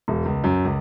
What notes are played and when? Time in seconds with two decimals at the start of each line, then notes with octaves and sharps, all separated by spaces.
0.08 E1
0.25 C#2
0.44 F#2
0.65 C#2